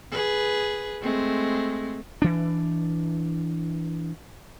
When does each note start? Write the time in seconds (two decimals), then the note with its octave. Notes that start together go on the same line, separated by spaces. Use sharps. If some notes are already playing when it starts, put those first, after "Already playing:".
0.11 G#4 B4
1.02 G#3 A3 C4
2.22 E3 D4